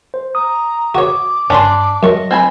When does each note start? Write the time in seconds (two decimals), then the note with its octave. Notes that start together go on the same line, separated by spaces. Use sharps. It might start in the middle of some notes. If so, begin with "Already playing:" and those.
0.14 C5
0.35 A#5 D#6
0.95 F#4 C#5 D6
1.50 G2 C#4 D4 B5 C6
2.03 F#2 F#3 D#5 C#6
2.31 C4 G#5 B5